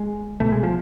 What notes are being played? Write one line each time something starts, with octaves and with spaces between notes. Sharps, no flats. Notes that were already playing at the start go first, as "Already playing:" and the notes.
Already playing: G#3
C2 B2 A3
G#3
F3